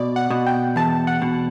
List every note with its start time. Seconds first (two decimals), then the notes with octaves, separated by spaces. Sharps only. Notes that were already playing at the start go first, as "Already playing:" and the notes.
Already playing: B2 D5
0.16 F#5
0.30 B2
0.46 G5
0.76 E2 A5
1.07 F#5
1.22 B2